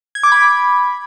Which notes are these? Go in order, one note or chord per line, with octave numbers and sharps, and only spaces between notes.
G#6
D6
B5